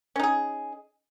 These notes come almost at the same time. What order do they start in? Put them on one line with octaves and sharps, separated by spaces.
C#4 D#4 G#4